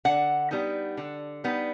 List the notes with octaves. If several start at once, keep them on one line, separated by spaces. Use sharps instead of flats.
D3 F#5
G3 B3 D#4
D3
G3 B3 D#4